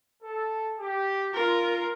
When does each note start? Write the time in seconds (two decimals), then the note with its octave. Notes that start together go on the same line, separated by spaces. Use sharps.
0.23 A4
0.79 G4
1.34 F4 A#4